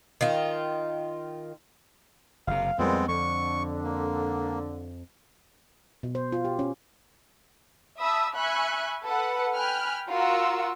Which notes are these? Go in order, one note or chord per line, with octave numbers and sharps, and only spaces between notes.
D#3 F4
F#1 C3 F5
F2 A#2 G3 G#3 B3 C4
F2 D3 C#6
A#3
B2
C5
F4
G4
C#4
E5 A5 B5 D#6 E6
E5 G#5 B5 C#6 F#6
A4 B4 F#5
G5 G#5 B5 F6 F#6
F4 F#4 A#4 F#5 E6